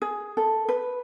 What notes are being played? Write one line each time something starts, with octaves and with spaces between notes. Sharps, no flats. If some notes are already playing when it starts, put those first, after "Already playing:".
G#4
A4
B4